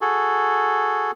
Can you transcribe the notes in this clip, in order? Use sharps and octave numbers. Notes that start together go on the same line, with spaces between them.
F#4 G#4 A4